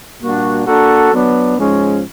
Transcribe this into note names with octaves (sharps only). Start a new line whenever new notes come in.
A#2 G3 A#3 D4 F#4
A#3 D4 F#4 A4
F#3 B3 D4
G#2 F3 G#3 C#4